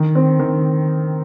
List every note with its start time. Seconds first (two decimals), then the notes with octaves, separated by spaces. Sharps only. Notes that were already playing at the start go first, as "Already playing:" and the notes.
Already playing: D#3
0.15 C4
0.39 D#3